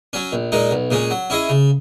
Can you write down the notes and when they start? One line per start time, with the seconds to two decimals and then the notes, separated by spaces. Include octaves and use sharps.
0.13 F#3 C#4
0.33 A#1
0.52 A#2 G#3 D#4
0.71 B1
0.91 A#2 G#3 C#4
1.10 F#3
1.30 C#4 E4 G#4 D#5
1.49 C#3